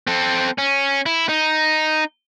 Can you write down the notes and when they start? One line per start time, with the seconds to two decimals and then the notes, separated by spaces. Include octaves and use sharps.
0.07 C4 A4
0.58 C#4
1.06 E4
1.29 D#4